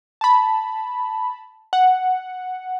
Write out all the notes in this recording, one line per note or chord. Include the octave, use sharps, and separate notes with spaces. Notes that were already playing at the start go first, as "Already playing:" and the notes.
A5 B5
F#5